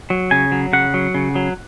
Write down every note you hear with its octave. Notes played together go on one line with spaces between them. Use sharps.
F#3
C#3 G#5
F#3
C#3 F#5
F#3
C#3
F#3